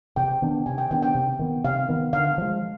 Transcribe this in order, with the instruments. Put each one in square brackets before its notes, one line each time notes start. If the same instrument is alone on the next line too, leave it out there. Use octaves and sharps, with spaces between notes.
[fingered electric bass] C3 [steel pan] G5
[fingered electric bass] D#3 B3 D4
[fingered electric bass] C3 [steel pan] G#5
[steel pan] G5
[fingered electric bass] D#3 B3 D4 [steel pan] G5
[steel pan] G5
[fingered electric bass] C3
D#3 B3
[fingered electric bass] C3 [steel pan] F5
[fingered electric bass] D#3 B3
[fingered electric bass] D3 [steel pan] F5
[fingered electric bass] F3 G#3